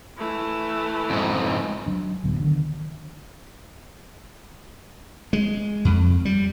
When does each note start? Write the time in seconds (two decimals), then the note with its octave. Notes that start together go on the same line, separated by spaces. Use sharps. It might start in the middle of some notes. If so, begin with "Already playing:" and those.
0.18 E3 A3
1.10 F2 G#2
1.86 F#3 D4
2.23 A1 D2 F#3 B3
2.39 D3 D#3
5.33 G#3
5.85 F2
6.25 G3